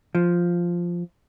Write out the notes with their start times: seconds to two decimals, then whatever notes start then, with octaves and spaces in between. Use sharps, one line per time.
0.15 F3